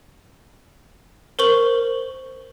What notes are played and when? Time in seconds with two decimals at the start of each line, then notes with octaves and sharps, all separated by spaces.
1.39 A#4 C5 C#6 F#7